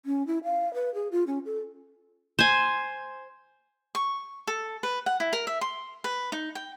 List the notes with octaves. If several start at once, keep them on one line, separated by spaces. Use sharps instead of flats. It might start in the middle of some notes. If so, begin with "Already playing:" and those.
C#4
E4
F5
B4
G#4
F4
C#4
A4
C5 G#5
C#6
A4
B4
F#5
E4
A#4
E5
C6
B4
D#4
G5